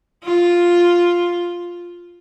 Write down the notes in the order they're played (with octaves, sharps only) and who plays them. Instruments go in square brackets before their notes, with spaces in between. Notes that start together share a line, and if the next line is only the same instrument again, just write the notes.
[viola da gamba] F4